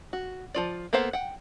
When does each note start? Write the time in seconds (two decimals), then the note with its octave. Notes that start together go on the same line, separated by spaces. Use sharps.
0.13 F#4
0.54 F3 F4 D5
0.93 A#3 B3 A4 C5 F5
1.13 F#5 G5